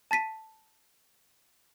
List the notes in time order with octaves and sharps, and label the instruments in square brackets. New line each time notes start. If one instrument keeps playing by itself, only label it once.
[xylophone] A5 A6 B6 D#7